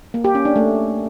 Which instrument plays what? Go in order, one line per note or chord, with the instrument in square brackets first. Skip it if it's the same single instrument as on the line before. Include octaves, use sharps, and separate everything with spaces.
[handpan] A#3
G4
C#4
D4
A3